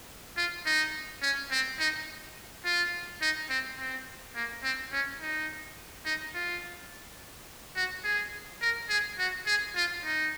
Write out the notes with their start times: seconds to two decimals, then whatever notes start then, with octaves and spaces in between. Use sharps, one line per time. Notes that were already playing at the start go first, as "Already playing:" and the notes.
0.37 F4
0.66 D#4
1.22 C#4
1.51 C4
1.79 D#4
2.65 F4
3.21 D#4
3.50 C4
3.79 C4
4.36 A#3
4.63 C4
4.92 C#4
5.20 D#4
6.06 D#4
6.34 F4
7.76 F#4
8.04 G#4
8.62 A#4
8.89 G#4
9.19 F#4
9.46 G#4
9.76 F4
10.04 D#4